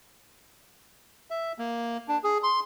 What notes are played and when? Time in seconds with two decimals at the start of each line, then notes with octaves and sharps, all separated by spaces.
1.30 E5
1.58 A#3
2.08 D4
2.24 G#4
2.43 C6